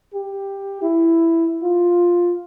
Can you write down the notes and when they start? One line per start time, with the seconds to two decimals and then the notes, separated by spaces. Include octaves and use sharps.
0.13 G4
0.82 E4
1.63 F4